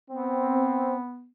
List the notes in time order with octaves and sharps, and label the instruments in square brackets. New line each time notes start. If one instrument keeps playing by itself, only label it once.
[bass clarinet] B3 [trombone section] C4